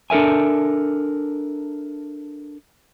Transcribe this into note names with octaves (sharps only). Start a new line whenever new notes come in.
D4 A4 A#4 E5 G#5